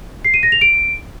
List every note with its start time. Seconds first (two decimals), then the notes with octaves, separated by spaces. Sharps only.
0.25 C7
0.34 D#7
0.43 A#6
0.52 F7
0.61 D7